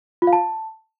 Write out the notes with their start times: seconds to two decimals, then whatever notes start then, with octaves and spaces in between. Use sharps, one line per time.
0.22 F4
0.27 F5
0.33 A5